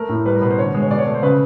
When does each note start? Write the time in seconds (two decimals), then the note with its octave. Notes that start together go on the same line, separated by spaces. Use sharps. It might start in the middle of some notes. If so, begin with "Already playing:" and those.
Already playing: A3 A#4
0.09 A2
0.26 G3 B4
0.36 A#4
0.42 B2 B4
0.51 C5
0.58 D3 C#5
0.74 G#3
0.83 C#5
0.90 B2 D5
0.99 C#5
1.07 A3
1.14 C5
1.22 C#3 B4